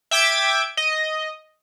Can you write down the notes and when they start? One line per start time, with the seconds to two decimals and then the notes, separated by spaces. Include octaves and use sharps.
0.11 E5 G5 D6 G#6 D7
0.77 D#5